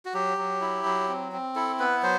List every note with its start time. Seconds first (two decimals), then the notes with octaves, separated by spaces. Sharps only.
0.05 F#4
0.14 F#3 G4
0.38 F#3
0.61 E4
0.85 F#3
1.08 C4
1.32 C4
1.55 E4 A4
1.79 B3 B4
2.03 F#3 C5